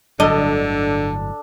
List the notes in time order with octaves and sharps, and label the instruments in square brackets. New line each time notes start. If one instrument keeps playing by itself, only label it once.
[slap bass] G1 A2 F#3 [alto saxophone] D3 [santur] D4 A4 [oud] D#5